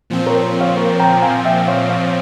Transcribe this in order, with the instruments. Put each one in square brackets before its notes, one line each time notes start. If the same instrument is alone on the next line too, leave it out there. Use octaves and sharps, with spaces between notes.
[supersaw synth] A#2 F3 C4
[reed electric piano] A#4 C#5
C#5 F5
A#4 C#5
G5 A#5
F5 G#5
E5 G5
C#5 F5
C#5 F5